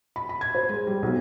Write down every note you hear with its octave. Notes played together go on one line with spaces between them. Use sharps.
B5
B5
G#6
C5
G#3
G3
B1